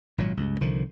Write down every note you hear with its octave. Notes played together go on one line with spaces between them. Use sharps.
G#1 A#2 F#3
C#2 G2
C2 D3 D#3 F3